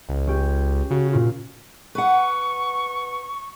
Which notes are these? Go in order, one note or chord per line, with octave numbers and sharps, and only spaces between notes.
C#2
C#4 G4
C#3 F#4
A#2 F4 F#4
B4 F#5 C#6